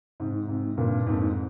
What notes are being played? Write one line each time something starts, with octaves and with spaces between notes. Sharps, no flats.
G#2 C3
G#2 C3
G2 A#2
F2 G#2